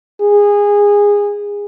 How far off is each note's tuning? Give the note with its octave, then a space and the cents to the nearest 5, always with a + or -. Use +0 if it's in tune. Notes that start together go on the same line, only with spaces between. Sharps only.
G#4 -20